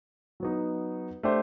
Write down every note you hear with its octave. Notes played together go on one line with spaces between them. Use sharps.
F#3 B3 D#4
A3 D4 G4 C5